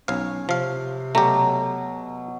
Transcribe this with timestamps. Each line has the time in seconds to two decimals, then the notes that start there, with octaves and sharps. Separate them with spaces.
0.08 B1 C#4 C#5 F5
0.49 C3 F3 F5
1.15 B2 F#3 A3 G4 A#5